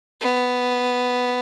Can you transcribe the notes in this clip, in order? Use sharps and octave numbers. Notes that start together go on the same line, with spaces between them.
B3